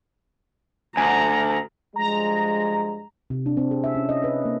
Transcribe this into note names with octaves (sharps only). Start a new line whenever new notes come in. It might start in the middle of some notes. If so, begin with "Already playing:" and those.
D2 G#5 A#5
G2 F3 G#3 A#5
C3
D4
C4
G#4
E5
C#4
D#5
B4
A#3